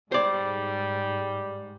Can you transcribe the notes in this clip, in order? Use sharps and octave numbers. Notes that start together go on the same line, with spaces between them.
G#2 G3 C5 D5